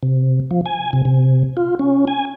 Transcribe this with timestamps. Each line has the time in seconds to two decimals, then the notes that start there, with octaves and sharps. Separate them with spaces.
0.03 C3
0.51 F3
0.66 G#5
0.93 C3
1.05 C3
1.57 F4
1.79 C#4
2.07 G#5